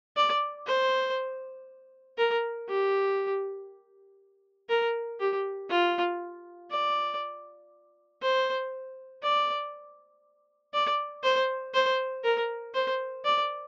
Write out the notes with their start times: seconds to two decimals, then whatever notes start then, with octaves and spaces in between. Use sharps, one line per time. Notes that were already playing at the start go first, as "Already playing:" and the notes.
0.17 D5
0.66 C5
2.18 A#4
2.69 G4
4.69 A#4
5.20 G4
5.70 F4
6.71 D5
8.22 C5
9.23 D5
10.74 D5
11.23 C5
11.74 C5
12.24 A#4
12.74 C5
13.25 D5